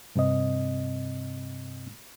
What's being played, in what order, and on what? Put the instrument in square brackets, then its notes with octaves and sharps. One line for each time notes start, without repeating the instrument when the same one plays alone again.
[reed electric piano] G2 C3 C4 D#5